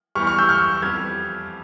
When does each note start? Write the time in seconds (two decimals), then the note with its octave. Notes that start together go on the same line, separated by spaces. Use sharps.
0.15 E2 E3 G3 C#6 F6
0.27 C#6 F6
0.38 E6 G6
0.49 C#6 F6
0.82 F2 E3 G3 F6 G#6